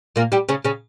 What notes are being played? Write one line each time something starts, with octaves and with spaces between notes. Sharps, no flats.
A#2 A#3
G3 G4
C#3 C#4
C#3 C#4